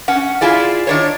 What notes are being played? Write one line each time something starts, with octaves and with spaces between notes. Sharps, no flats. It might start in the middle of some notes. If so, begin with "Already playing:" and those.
C#4 F#5
E4 F4 G#4 D5
D#3 D4 C#5